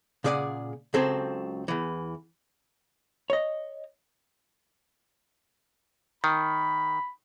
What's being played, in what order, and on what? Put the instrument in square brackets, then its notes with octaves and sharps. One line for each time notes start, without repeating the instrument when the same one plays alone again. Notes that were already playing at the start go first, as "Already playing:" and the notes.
[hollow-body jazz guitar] A#2 C#3 G#4 D5 F#5
C#2 F#3 C4 G#4 A4 C5
E2 E3
C#5 D#5
[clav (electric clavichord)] D#3 [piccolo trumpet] B5